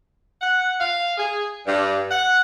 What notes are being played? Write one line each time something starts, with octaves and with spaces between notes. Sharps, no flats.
F#5
F5
G#4
G2
F#5